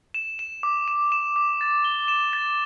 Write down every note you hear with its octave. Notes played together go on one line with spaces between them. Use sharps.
E7
E7
D6
E7
E7
D6
A6
G7
E7
A6